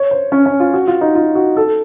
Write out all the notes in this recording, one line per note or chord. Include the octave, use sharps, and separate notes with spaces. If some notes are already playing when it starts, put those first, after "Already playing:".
Already playing: C#5
C5
C#4
C#4
F4
F#4
F4
D#4
F4
F#4
A4